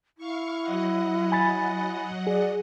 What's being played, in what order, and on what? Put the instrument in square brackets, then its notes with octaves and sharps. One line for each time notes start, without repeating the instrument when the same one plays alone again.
[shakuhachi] E4 [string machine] F5 C#6
[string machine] F#3 D#5 F#5
[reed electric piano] G#5 B5 A6
[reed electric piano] G#4 [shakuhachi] D5